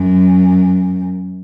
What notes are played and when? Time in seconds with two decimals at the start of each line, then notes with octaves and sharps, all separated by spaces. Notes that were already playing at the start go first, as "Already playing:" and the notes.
Already playing: F#2